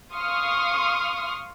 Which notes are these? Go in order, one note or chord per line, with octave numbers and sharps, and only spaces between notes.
F5 C6 C#6 D#6 F6